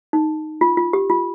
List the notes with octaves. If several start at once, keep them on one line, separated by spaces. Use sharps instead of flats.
D#4
F4
F4
G4
F4